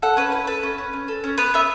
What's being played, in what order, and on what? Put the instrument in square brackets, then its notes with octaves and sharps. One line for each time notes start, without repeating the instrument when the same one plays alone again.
[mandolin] A4 F#5
C#4 B4
E4 B4
A4 B4
C#4
C#4
C#4
A4
C#4
B3 B4
B3 E5